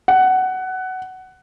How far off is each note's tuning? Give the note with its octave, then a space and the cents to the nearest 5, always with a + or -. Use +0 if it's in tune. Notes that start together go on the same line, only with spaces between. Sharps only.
F#5 +15